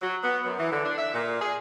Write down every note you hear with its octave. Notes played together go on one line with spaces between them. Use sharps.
F#3
B3
F#2
E3
D3
D4
E5
A#2
G#4